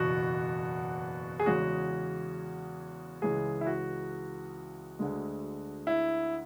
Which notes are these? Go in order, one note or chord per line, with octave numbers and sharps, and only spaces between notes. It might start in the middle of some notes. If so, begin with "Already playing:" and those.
Already playing: F#1 E2 B2 F#4
G#4
E2 C#3 G#3 F#4
C#2 C#3 E3 G#3 G#4
E4
F#4
D2 D3 G#3
E4